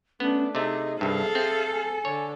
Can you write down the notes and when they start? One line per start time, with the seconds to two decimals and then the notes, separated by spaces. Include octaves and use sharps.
0.20 A3 B3 C#4 D4
0.55 C3 A3 D#4 G#4 D#5
1.01 C2 G2 G#4 A4 E5 F5
1.35 C4 E5
1.71 G#5
2.05 D3 A4 C#5